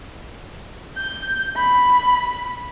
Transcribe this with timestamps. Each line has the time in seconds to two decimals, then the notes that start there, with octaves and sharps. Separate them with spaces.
0.97 G6
1.56 B5